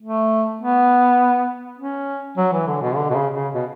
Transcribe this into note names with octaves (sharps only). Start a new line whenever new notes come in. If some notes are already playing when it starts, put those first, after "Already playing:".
A3
B3
C#4
F#3
E3
D3
B2
D3
B2
C#3
C#3
B2